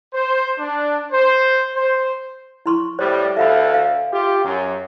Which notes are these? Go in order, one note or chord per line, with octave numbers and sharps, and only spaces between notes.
C5
D4
C5
C5
E4 C6 C#6
A2 G3 C5
D2 A4 E5 F5 B5
D#5 F5
F4 G4
F#2